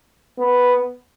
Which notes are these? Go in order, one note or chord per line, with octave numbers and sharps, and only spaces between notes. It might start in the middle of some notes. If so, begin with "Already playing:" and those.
B3